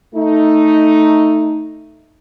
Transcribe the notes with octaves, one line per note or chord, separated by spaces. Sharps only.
A3 D#4